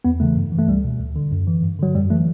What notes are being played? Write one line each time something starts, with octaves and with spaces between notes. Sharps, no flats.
E2 B3
C#3 E3 A3
G2
E3
A3
C#2 G3
B2
D2
D3
F#2
E3
G2
D3 F#3
F#2 G3
E3 A3